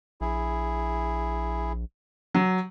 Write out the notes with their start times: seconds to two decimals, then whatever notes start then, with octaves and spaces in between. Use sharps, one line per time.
0.21 A#1 E4 G#4
2.34 F#3